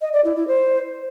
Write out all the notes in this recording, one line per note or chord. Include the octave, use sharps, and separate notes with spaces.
D#5
D5
E4
E4
C5